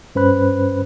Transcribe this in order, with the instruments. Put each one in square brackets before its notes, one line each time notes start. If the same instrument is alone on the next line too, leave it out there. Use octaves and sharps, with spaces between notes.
[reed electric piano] G2 C#4 B4 C5 B5 F#6